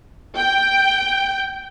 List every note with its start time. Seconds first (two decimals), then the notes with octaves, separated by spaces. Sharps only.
0.37 G5